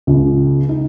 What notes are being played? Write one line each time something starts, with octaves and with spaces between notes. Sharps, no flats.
C#2
D#4